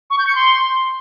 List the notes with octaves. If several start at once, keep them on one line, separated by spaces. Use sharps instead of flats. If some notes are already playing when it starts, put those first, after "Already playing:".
C#6
G6
C#7
C6